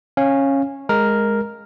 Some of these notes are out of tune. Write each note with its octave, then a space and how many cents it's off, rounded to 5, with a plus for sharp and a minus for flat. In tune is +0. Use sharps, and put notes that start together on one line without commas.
C#4 -15 F5 +0
G#3 +0 A#4 +0